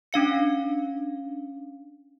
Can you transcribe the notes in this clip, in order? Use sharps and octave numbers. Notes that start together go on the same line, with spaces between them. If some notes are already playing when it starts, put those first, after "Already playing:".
C#4 D4 F5 C#7